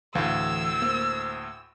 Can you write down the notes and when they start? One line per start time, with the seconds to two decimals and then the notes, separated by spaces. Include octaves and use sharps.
0.15 D2 A2 E3 F5 E6
0.82 A#3 C5